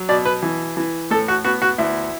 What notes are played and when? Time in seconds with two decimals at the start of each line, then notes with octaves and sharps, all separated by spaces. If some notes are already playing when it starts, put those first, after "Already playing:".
Already playing: F#3
0.09 B2 D5
0.25 B4
0.43 E3
0.77 E3
1.11 A2 A4
1.28 F#4
1.45 B3 F#4
1.62 F#4
1.78 D2 E4